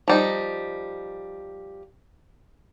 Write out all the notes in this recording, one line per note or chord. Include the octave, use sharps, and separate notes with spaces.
F3 G3 D#4